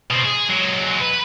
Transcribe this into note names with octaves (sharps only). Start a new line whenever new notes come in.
B2 C4
G#4
F#3 G#3
B4